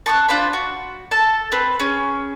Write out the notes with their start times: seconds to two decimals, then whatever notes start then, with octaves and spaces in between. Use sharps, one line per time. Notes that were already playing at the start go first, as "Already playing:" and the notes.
0.06 A5 C#6 D#6 F#6
0.28 D4 F4 C5 B5
0.53 F#4
1.11 A4 A5
1.52 C4 B4
1.80 C#4 G#4